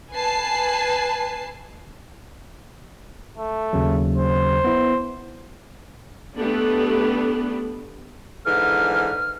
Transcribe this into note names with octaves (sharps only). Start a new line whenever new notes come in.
B4 G#5 A5 C7
A3
D#2 C#3 F#3
C5
B3 E4
A3 B3 D4 G4 A4 B4
G#2 D3 E3 F6